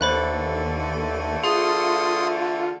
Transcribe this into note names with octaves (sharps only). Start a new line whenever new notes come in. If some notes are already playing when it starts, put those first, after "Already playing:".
D#2 D3 E3 A3 C5 B5 F#6
F4 G#4 C6 D#6